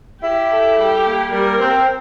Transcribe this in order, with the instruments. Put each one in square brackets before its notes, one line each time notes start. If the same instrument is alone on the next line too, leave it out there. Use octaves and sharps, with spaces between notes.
[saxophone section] E4 [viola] G4
[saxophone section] A4
[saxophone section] G3 [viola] G4
[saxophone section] A#3
[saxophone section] G3 [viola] A#4
[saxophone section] C4